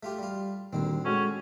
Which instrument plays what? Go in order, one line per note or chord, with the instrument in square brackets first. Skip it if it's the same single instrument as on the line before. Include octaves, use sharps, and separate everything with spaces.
[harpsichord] A3 F4 G4
G3 F4
[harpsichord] D2 D3 C4 [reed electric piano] A#2 D#3 G3
[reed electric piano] G#3 F#4 A4 [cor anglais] C#4